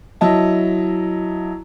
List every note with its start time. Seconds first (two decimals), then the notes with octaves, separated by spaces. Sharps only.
0.21 F#3 E4 D#5 A5